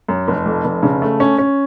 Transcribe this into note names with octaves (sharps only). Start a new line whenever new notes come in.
F#2
F1
F2
F1
C#3
A3
C#4
C#4